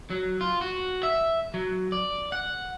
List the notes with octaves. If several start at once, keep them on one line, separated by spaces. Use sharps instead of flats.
F#3
F4
F#4
E5
F#3
D5
F#5